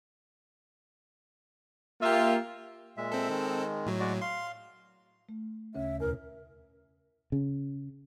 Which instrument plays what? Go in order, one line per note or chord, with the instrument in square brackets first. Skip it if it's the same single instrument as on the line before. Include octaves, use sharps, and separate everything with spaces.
[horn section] A#3 F4 [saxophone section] G4 E5
[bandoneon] A#2 G#3 E5
[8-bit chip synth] C4 A4
[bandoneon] D#3 G#3
[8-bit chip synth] A2 F#3
[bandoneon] G#3 F#4 D5
[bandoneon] F5 [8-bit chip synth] C6
[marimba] A3
[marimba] D2 C#3 C#4 [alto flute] E5
[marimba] E2 B2 [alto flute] A#4
[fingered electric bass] C#3